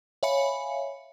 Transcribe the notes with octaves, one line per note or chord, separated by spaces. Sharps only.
C#5 E5 F5 G#5 B5 C#7